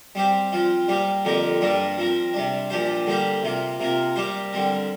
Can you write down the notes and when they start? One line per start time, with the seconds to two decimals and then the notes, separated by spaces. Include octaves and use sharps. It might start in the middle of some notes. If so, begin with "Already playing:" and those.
0.15 G3 C4 G4 C5
0.52 F3 C4 F4
0.88 G3 A#3 G4
1.25 F2 D3 A#3 G4 A#4
1.61 G2 G3 A#3 D4 A#4
1.97 F3 C4 A#4
2.34 C3 G3 D4
2.70 A#2 F3 D4 G4 C5
3.07 D3 G3 A#3 G4 C5
3.43 C3 A#3 F4
3.80 C3 A#3 F4 A#4
4.16 G3 A#3 G4 C5
4.53 D3 G3 C4 A#4